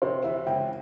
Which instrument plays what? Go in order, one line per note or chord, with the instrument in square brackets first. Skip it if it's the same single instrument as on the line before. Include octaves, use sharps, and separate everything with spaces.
[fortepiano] C3 [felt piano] C5
[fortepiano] E3 [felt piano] E5
[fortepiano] C#2 [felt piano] G5